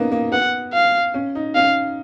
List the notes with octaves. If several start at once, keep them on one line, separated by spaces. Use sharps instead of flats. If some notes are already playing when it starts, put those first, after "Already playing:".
Already playing: A#3 B3 C#4 D#4
A#3
B3 F#5
F5
C#4
D#4
C#4 F5